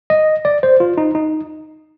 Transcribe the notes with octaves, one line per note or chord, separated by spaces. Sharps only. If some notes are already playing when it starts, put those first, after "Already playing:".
D#5
D5
C5
F4
D#4
D#4